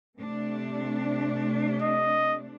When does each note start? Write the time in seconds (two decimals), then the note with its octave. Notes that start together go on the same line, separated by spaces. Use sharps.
0.19 C3 A3 D4
1.82 D#5